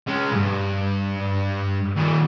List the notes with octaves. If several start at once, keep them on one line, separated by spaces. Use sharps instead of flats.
G#3 C#4
B1 G2
D#2 A#2